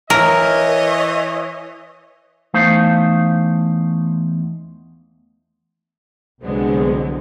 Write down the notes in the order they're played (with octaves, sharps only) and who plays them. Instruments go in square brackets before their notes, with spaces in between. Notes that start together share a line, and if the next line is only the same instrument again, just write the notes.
[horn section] E3 C#5 D#5 [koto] A#4
[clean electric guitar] E2 A3 D#4 C5 F5
[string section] C2 D3 F#3 G#3 B3 C4